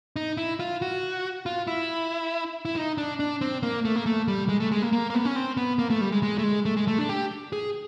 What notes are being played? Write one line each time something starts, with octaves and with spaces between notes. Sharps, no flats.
D#4
E4
F4
F#4
F4
E4
E4
D#4
D4
D4
C4
A#3
A3
A#3
A3
G3
G#3
A3
G#3
A#3
A#3
A#3
B3
C#4
C4
B3
A#3
A3
G3
G#3
G#3
A3
G#3
A3
G#3
A3
D4
G4
G#4